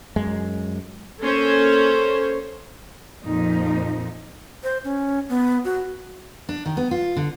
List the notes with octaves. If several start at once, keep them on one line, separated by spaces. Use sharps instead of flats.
F#2 G#3
A#3 C#4 A4 C5 C#5
F2 A#2 F3 D#4
C5
C#4
B3
F#4
D4
D#3
B3
F4
D3